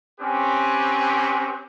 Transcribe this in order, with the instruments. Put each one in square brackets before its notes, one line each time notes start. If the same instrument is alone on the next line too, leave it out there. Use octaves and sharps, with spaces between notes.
[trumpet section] C4 C#4 G4 B4